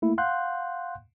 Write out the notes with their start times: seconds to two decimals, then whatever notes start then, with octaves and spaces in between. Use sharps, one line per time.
0.02 A3 A#3 E4
0.18 F5 F#5 C6 F#6 G6